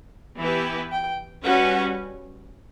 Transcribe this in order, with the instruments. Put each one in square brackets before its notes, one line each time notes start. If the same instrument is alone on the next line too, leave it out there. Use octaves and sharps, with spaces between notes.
[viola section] E3 B3 E4 G4 B4
[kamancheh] G5
[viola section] G3 C#4 F#4 B4 [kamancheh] F#5